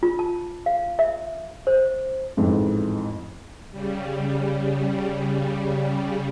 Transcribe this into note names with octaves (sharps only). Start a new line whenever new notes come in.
F4
A5
F5
E5
C5
A1 F2 G#2
C#3 G3